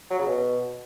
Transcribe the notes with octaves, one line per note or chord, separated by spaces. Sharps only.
F#3
C#3
B2